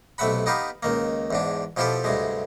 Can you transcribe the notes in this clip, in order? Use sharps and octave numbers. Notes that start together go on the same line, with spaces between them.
B1 C3 A3 E5 F#5 B5
B3 D#4 G4 B4 F5
C#2 D#3 A#3
E2 G#2 D4
B2 F3 E4 F4 G4 A4
D2 G2 C3 G#3